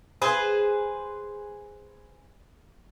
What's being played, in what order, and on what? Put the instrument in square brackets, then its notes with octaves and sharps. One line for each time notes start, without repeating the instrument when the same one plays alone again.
[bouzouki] G#4 B4 C5